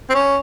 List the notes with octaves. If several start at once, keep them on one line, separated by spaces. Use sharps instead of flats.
C4
C#4